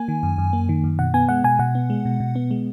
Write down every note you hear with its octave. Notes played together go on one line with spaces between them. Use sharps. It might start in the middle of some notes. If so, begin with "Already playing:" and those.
Already playing: A#3 G#5
D#3
F#2
F#2
A#3
D#3
F#2
B2 F#5
B3 G#5
G#3 F#5
B2 G#5
B2 F#5
B3
G#3
B2
B2
B3
G#3